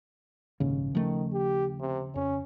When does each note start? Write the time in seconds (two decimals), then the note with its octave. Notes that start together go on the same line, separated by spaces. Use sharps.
0.60 A#1 D#2 G#2 C#3
0.95 D#3 F3 A3
1.32 G4
1.81 C3
2.15 F2 C#4